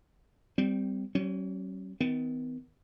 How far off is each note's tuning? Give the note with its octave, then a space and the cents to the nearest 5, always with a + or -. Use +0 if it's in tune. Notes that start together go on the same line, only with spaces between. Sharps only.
G3 +0 C4 -20
F#3 +45 C#4 -25
D#3 +30 B3 +40